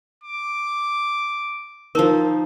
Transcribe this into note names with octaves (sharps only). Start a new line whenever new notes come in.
D6
F3 D#4 A#4 A5